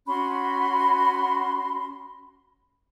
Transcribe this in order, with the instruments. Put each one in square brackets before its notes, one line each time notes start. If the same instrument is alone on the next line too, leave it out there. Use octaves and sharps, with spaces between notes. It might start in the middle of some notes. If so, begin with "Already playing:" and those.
[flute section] C#4 F#4 B5 C6